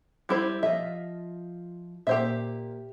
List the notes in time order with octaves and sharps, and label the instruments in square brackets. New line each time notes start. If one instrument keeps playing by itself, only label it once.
[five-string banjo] G3 E4 C5
[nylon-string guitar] F3 F4 D#5 [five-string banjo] E5
[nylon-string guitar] A#2 [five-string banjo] G4 C5 E5